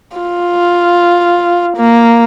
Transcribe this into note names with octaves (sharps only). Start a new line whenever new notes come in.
F4
A#3